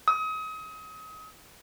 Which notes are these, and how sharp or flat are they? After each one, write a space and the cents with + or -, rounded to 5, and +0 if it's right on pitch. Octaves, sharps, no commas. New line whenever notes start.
D#6 +35